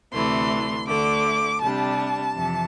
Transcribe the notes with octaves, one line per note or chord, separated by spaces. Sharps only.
D2 C3 E3 A3 C6
D2 D3 A3 D6
C3 G3 D4 A5
F2 C3 E3